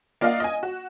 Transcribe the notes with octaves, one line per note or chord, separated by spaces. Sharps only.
A#3 F4 D5 D#5 F5 F#5
D#5 G#5
F#4